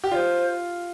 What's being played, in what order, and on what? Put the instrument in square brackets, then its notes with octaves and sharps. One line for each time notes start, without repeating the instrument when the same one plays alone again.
[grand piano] G4
[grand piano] F4 [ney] C5 D5